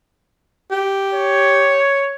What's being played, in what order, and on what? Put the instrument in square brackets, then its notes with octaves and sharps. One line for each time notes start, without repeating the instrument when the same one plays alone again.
[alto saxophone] G4
[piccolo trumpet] C#5